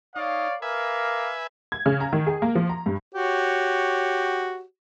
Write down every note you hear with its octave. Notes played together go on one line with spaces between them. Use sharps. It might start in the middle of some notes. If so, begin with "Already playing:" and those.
D#4 C#5 D5 F5
A#4 B4 E5 F5 G#5 D6
G#6
C#3
A#5
D#3
G#4
A#3
F3
A#5
G2
F#4 G4 C#5